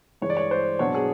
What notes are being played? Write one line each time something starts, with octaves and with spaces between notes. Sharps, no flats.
G2 E3 G#3 C#5
D5
C#5
C5
B2 F#3 B3 D4 C#5
G#4